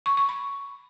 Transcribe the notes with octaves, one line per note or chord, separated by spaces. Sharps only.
C#6
C#6
B5